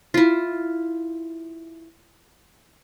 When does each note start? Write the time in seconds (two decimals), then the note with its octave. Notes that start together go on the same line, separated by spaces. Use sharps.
0.14 E4 F4